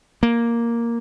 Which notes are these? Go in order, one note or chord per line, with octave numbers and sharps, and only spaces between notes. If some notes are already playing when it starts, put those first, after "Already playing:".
A#3